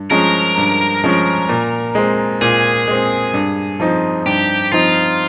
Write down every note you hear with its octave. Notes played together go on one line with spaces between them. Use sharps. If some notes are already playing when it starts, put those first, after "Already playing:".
Already playing: G2
F3 G#3 C#4 A#4
G2
F3 G#3 C#4
A#2
G#3 C4
A#2 G#4
G#3 C4
G2
F3 C4 D#4
G2 G4
F3 C4 D#4 F4